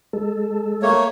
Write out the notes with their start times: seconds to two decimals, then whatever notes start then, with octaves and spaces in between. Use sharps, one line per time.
0.13 G#3 A4
0.82 A3 A#3 C#5